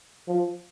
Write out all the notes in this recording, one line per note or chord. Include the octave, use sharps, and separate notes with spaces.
F3